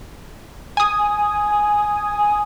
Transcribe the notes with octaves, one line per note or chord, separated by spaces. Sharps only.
G#5 D#6